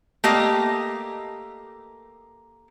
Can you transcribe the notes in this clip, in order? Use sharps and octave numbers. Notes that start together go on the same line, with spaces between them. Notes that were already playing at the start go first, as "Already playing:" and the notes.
A3 A#3 G4 D#5